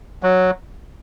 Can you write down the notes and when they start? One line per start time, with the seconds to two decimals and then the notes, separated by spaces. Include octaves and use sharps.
0.23 F#3